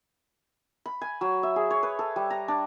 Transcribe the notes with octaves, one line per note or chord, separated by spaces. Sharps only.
B5
G#5
F#3
E5
G#4
C#5
B4
A4
G3
A#5
D4